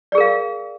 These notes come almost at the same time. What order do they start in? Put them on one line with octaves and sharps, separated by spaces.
D5 G#4 A#4 F5